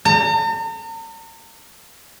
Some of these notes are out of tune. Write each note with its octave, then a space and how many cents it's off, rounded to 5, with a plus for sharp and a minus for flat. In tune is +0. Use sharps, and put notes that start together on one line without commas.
A#5 -45